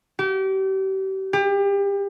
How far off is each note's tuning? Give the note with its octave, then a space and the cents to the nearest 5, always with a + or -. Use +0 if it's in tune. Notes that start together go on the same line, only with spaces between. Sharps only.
G4 -35
G4 +30